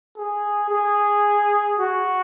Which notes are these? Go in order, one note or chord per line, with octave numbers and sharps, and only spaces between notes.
G#4
G#4
F#4